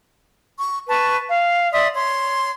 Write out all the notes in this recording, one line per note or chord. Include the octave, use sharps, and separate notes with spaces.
C#6
B4 A5 C#6
F5
D5 E5 C6 D#6
C#5 C6